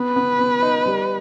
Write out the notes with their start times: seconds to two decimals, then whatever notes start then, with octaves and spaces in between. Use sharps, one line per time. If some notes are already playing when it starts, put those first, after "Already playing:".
Already playing: B3 B4
0.16 B3
0.39 B3
0.62 D#4
0.86 G3